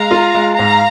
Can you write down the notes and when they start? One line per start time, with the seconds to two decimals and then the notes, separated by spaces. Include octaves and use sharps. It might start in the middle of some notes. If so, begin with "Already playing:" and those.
Already playing: G#3 F5 A#5
0.11 F4
0.35 G#3
0.58 G#2 F5 A#5